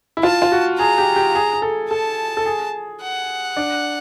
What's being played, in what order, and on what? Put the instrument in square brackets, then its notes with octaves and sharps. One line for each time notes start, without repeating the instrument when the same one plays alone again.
[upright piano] E4
[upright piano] F4 [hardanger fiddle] A5
[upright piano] F4
F#4
[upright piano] G#4 [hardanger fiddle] A#5
[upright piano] G4
G4
G#4
G#4
A4
[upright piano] A4 [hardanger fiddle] A5
[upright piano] A4
G#4
[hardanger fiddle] F#5
[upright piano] D4